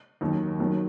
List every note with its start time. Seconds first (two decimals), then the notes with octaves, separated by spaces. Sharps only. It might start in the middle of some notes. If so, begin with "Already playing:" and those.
0.21 D#2 D#3 F#3
0.59 D#2 D#3 F#3